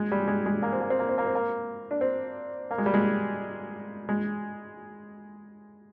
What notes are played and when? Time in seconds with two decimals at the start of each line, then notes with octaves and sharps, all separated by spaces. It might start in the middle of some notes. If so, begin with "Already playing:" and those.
Already playing: G#3
0.12 G3
0.28 G#3
0.46 G#3
0.62 A#3
0.73 C4
0.81 A#3
0.90 C4
0.99 A#3
1.09 C4
1.18 A#3
1.27 C4
1.35 A#3
1.91 D4
2.01 C4
2.71 A#3
2.78 G#3
2.86 G3
2.94 G#3
4.09 G#3